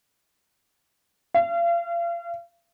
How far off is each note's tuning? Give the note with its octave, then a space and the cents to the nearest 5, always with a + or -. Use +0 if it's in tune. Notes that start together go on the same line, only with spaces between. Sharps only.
F5 -35